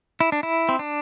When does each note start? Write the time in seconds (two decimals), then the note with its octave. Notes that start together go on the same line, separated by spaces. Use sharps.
0.20 E4
0.32 D4
0.43 E4
0.69 C4
0.79 D4